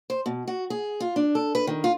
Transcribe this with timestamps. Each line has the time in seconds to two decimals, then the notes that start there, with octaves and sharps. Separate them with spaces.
0.10 C5
0.26 B2
0.48 F#4
0.70 G#4
1.00 F4
1.16 D4
1.35 A4
1.55 B4
1.67 D#3
1.84 F4